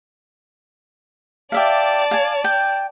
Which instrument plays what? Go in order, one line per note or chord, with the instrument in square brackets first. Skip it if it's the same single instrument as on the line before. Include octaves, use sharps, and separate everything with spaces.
[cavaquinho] G4 E5 F5 [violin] D5 A5
[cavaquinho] F5 G#5
G5